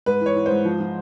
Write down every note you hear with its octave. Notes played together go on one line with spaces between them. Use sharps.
G#2 B4
E3 C#5
E3
C5
G#2
F3
F3